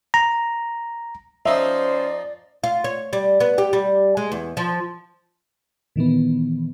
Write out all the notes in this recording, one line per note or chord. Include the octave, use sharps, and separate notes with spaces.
A#5
F3 C#4 D#4 C5 D5 E5
F4
C#5
G3
B3
G4
G3
G#3
E2
F3
A#2 D#3 E3 B3